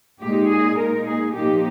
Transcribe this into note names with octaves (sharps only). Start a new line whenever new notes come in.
A#2 G#3 D#4 G4
G#4
A#2 G#3 D#4 A#4
G#4
A#2 F3 A#3 D#4 G4